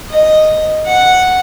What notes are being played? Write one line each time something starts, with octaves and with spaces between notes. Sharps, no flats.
D#5
F#5